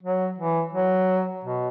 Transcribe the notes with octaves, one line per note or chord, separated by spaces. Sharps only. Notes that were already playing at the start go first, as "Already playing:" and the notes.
F#3
E3
F#3
B2